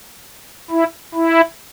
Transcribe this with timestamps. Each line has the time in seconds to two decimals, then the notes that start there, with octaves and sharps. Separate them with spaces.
0.71 E4
1.15 E4